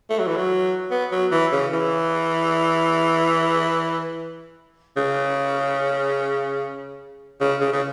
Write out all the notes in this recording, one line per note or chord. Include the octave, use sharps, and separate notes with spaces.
A3
F#3
E3
F#3
B3
F#3
E3
C#3
E3
C#3
C#3
C#3
C#3